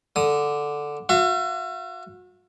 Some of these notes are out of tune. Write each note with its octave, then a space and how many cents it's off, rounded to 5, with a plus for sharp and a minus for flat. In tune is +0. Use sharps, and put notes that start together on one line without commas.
D3 +0 D#6 +0
F#4 -35 E5 +40